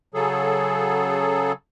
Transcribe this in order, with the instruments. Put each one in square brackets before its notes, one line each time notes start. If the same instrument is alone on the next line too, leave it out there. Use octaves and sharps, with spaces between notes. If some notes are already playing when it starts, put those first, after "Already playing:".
[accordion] C#3 F#3 G#4 A4